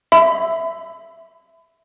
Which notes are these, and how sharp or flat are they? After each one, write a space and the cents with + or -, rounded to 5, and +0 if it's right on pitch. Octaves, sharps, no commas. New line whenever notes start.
E5 +0 B5 +30